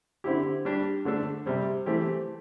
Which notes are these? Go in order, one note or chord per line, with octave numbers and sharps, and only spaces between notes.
D3 C4 E4 G4
G3 D4 G4
D3 A3 D4 A4
C3 G3 C4
E3 A3 C4 G4